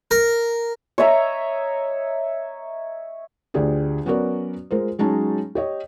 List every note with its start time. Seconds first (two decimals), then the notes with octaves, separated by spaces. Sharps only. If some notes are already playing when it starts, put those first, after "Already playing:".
0.11 A#4
0.98 C#5 D#5 E5 A#5
3.54 D2 D4 F4 G4 G#4 D5
4.05 F#3 B3 C#4 F#4 A#4 D5
4.71 G#3 F4 A#4 C5
4.99 F#3 G#3 C#4 D#4 A5
5.55 G4 C#5 D#5